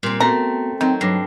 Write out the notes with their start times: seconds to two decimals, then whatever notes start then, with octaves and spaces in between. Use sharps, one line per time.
0.03 A#2 G3 C4
0.20 A3 B3 C4 F#4 A#5
0.81 D#3 F#3 C4 G6
1.01 G2 F#3 D6 A#6 C7